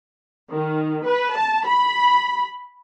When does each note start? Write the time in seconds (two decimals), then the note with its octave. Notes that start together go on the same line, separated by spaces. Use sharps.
0.51 D#3
1.05 B4
1.37 A5
1.68 B5